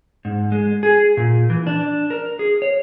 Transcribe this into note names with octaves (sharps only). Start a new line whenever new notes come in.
G#2
G#3
G#4
A#2
E3
D4
A#4
G#4
C#5